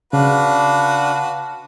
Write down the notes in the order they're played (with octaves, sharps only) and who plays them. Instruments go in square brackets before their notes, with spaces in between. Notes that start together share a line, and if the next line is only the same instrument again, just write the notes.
[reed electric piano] C#3 [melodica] D4 [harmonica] F#4 B4 [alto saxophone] F5